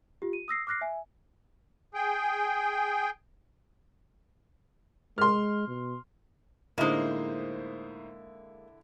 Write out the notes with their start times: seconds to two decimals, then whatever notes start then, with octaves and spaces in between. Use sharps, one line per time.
0.22 F4 G4
0.33 D#7
0.48 D#6 E6 A#6 C7
0.67 D6 F6 F#6 A#6 C7
0.81 E5 G#5
1.94 G#4 G5
5.18 G#3 C6 F6
5.68 B2
6.78 A2 D3 G#3 A#3 D#4 E4 C5